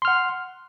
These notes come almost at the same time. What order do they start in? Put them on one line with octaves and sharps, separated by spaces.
C6 F6 F#5